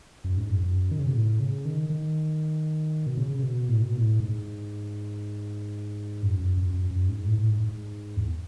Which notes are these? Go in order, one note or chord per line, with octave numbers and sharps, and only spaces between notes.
F#2
G#2
F#2
F#2
D#3
C#3
B2
A2
C#3
D#3
D#3
B2
C#3
C#3
B2
A2
B2
A2
G#2
F#2
F#2
F#2
F#2
F#2
G#2
A2
A2
G#2
G#2
E2